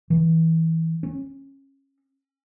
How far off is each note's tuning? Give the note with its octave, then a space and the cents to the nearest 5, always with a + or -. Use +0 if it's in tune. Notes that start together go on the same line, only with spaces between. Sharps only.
E3 -20
C#4 -20